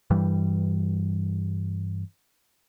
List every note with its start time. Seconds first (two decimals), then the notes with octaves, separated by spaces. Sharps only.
0.10 G2 E3 G3